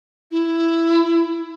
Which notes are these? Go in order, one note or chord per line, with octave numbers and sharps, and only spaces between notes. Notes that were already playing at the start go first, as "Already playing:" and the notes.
E4